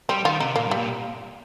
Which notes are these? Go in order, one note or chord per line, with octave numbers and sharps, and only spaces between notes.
G3 C4
D#3 F4
C3 D#4
A#2 A#3
G2
G3
A#2